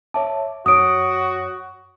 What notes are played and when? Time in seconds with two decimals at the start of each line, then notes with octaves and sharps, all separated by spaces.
0.14 C#5 E5 A5 D6
0.66 F#2 F#4 C#5 D#6 D7